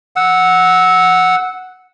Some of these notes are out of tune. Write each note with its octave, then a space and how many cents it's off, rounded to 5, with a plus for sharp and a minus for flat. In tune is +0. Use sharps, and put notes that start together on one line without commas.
F#5 -5 E6 -20